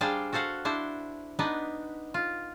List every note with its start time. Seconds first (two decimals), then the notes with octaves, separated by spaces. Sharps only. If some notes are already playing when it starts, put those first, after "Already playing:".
0.01 G3 D4 G#4 C5 D5 F5
0.33 F#4 A4 C5 F5 F#5
0.65 D4 E4 C5
1.39 B3 D4 D#4 B4
2.14 F4